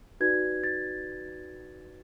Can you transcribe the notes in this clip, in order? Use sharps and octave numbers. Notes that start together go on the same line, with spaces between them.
D#4 F#4 B4 D5 G#6
A6